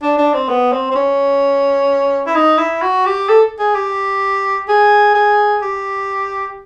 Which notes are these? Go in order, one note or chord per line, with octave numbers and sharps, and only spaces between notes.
D4
D4
C4
B3
C4
C4
C#4
E4
D#4
E4
F#4
G4
A4
G#4
G4
G#4
G#4
G4